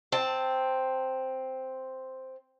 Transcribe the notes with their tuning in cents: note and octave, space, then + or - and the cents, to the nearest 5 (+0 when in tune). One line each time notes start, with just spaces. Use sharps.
C4 +0 A5 +15